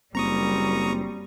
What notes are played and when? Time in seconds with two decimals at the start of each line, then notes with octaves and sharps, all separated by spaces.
0.15 F#1 G3 A#3 C4 A#5 C#6 D#6